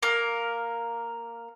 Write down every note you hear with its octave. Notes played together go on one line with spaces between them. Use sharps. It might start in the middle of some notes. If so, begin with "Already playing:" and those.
A#3 A#4